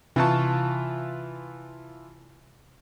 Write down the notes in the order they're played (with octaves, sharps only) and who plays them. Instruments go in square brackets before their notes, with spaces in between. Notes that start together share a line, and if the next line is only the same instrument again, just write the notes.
[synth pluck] C3 C#6 [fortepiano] E3 F4 A5